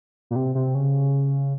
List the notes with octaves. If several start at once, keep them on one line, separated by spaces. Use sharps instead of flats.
A#2
C3
C3
C#3